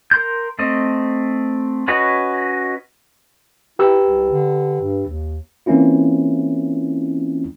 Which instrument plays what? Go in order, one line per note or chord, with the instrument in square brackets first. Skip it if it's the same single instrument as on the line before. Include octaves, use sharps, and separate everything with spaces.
[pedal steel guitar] A#4 C6 G6
A3 C4 D#5
C#4 F#4 B4 C#5 D#5
[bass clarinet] E4 [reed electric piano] G4 B4 E6
[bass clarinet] C2
D3
G2
D#2
[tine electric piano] E3 A#3 C4 C#4 E4 F4